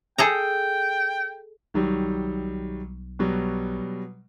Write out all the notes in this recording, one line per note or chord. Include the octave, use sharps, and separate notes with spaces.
G#4 A4 G5 A#5
B1 D#3 F#3 G3
B2 F#3 G3